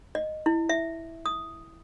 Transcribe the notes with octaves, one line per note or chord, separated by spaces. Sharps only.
D#5
E4
E5
D#6